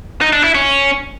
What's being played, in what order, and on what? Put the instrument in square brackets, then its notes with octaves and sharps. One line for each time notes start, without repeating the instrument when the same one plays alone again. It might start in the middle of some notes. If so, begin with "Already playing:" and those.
[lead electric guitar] D#4
D4
E4
C#4